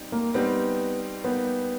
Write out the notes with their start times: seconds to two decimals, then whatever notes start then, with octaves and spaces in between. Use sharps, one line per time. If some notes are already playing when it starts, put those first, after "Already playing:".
Already playing: G3 C4 D#4 G4
0.12 A#3
0.34 G3 B3 C4 D#4 G4
1.24 G3 A#3 B3 D#4 G4